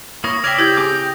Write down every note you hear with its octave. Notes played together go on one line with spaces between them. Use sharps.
A#3 E4 C#5 D#6 A#6
C#3 D5 E5 G5 G#6 A#6 F7
E4 G4 G6 G#6
C4 G#4 D6
G5